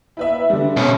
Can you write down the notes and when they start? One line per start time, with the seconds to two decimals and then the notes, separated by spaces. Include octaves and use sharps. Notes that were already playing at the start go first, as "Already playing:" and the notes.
0.17 E4 B4 E5
0.50 D3 G3
0.77 B2 C#4